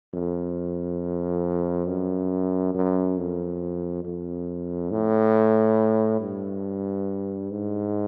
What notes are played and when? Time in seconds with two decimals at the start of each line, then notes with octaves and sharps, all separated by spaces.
0.14 F2
1.88 F#2
2.75 F#2
3.18 F2
4.05 F2
4.91 A2
6.21 G2
7.51 G#2